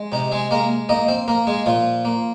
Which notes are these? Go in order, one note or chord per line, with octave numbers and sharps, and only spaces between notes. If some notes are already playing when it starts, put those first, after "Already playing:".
Already playing: G#3
C3 D#4
G#3 G#4
G#3 A#3 A#4
A#3 D#4 D#5
C4 C5
A#3 A#4
G#3 G#4
A#2 F3 F4
A#3